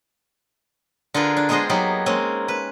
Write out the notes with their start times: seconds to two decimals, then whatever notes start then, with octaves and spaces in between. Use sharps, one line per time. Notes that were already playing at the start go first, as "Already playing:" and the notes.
1.14 D3 F4 G#4 A#4 B4
1.37 D4
1.49 G#3 B3 F4 G#4 C5 D#5
1.69 F#3 A#3 B3 D#4 G4 G#4
2.06 G#3 A#3 C4 C#4
2.48 B4